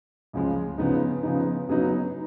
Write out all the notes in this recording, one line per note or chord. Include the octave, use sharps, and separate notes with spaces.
C#2 C#3 F3 G#3
C#3 F3 B3 D#4
C#3 F3 B3 D#4
C#3 F#3 B3 D#4